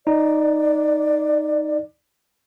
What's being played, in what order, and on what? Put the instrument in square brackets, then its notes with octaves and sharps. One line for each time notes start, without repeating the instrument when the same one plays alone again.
[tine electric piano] D#4 [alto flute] D5